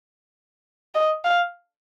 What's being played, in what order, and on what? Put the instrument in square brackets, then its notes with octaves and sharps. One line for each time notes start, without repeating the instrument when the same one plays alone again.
[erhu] D#5
F5